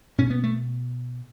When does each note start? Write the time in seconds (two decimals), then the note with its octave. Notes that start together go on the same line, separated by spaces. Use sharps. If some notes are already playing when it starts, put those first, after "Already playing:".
0.18 B2 C#4
0.30 B3
0.44 A3